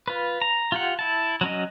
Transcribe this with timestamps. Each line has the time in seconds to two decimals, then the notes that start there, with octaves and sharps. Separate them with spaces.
0.08 F4 B4
0.42 A#5
0.72 F4 G4 F#5
0.99 E4 A5
1.41 F#3 C#4 D#5